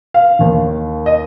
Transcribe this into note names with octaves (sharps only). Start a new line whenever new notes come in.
F5
D#2 D#3
D#5